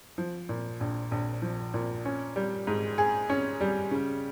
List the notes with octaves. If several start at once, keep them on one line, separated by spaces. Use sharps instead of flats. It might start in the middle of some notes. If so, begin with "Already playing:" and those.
F3
A#2
A#1
A#1
F3
A#2
C#4
G3
G#2
G#4
C#4
G3
C#3